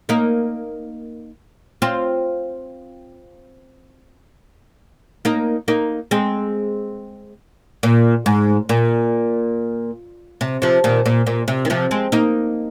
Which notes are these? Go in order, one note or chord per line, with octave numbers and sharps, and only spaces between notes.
A#3 D#4
C4 F4
A#3 D#4
A#3 D#4
G#3 C4
A#2
G#2
A#2
C3
C3 F3
A#2 D#3
A#2
A#2
C3
D#3
C3 F3
G#3 C4
A#3 D#4